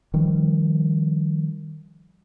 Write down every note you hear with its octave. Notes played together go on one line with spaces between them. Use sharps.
D#3 F3 G3